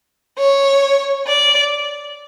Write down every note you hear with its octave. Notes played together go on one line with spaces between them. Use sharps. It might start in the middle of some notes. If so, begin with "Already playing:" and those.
C#5
D5